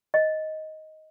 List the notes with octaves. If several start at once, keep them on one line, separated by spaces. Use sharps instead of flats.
D#5